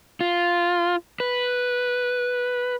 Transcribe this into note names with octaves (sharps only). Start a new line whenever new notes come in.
F4
B4